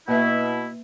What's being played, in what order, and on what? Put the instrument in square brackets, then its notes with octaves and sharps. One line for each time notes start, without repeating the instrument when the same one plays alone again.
[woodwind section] B2 E4 [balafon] A#3 B4 E5